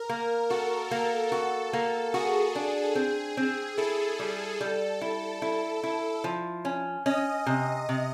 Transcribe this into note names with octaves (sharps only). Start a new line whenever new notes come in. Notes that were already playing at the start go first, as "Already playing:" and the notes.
Already playing: A#4
A#3
F#4 A4
A#3 A4
F#4 A4
A#3
F#4 G#4
D4
C4
C4
E4 A4
G3
G3
E4
E4
E4
F3
C#4
C#4 D#5
C3
C3